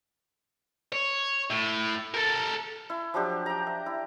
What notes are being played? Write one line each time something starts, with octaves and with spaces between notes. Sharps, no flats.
C#5
A2
A4 A#4
E4
F3 F#3 D4 G4
G5 A#5
E5
E4